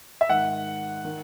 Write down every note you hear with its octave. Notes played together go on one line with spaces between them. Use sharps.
E5
G#2 D#3 F#5
D#3